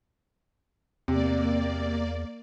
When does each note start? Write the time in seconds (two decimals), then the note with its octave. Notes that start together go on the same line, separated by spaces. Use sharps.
1.08 E2 C3 A#3 D5